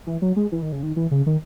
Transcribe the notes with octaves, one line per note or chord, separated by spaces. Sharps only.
E3
F#3
G#3
E3
D#3
C#3
D#3
E3
C#3
D#3